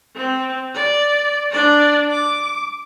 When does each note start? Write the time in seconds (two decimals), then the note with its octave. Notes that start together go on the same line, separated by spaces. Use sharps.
0.16 C4
0.75 D5
1.52 D4 D5
2.11 D6